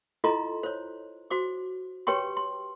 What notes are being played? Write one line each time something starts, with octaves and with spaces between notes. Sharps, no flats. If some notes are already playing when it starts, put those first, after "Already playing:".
E4 F4 A4 D#5 A#5 C6
C5 C#5
F#4 C5 D6
G4 B4 C#5 G5 C6 C#6
C6